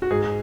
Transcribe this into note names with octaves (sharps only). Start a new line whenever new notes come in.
F#4
G#2 G#4